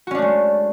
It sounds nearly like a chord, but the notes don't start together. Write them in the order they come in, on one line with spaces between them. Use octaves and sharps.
F#4 C#4 D4 A3 G#3